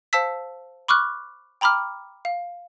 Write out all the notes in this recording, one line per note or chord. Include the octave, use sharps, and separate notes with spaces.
C5 F5 A5 E6 B6
B5 C#6 D6 F6 F#6
G5 A#5 B5 D6 F6
F5